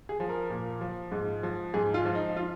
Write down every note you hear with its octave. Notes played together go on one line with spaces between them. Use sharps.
G#4
F3
A#4
A#2
F3
G#2
F3
G#2 G#4
F4
F3
D#4
F4